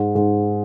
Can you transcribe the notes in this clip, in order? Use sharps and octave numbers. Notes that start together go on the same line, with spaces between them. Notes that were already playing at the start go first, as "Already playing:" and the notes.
Already playing: G#2
G#2